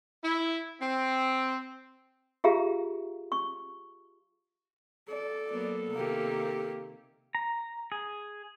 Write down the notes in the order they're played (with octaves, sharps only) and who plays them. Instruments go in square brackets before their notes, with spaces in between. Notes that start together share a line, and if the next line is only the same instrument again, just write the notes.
[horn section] E4
C4
[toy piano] F4 G4 G#4 E5 F5 A#5
C#6
[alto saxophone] A4 [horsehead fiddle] D5
[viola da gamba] F#3 A#3 B3
[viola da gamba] C3 D#3 [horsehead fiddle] A#3 G4
[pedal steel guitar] A#5
G#4